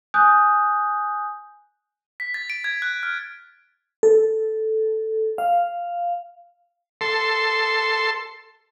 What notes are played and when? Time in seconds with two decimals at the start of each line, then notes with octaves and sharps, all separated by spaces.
0.14 G#5 D#6 F#6 G6
2.20 B6
2.34 A6
2.50 D7
2.64 G#6
2.82 F#6
3.03 F6
4.03 A4
5.38 F5
7.01 A4 C6